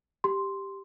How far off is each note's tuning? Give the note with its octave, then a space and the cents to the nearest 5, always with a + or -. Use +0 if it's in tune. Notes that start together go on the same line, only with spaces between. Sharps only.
G4 +0 C6 +0